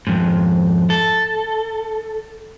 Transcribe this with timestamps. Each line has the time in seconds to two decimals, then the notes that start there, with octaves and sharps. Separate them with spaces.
0.07 F2 G#2
0.90 A4